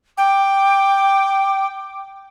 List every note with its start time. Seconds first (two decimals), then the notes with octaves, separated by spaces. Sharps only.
0.17 G5 D6